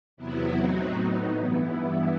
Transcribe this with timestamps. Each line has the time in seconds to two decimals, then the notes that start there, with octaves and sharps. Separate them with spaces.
0.17 E2 C3 F#3 B3 E4
0.56 A2 F#3 C4 D#4 F#4
0.95 A2 F#3 B3 D#4
1.34 G2 E3 B3 E4